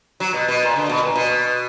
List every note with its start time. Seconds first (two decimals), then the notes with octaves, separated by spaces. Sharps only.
0.20 F#3
0.34 B2
0.48 B2
0.63 A#2
0.76 D3
0.89 B2
1.03 A#2
1.15 B2